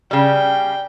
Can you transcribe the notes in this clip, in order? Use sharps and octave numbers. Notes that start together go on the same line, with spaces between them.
C#3 G3 G5